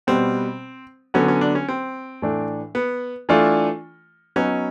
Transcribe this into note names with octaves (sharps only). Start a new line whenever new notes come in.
B2 G3 B3 C4
D3 F#3 B3 C#4
C#4
D4
C#4
C4
A2 E3 A3 D4
B3
E3 A3 D4 F4
F#3 B3 C#4 D#4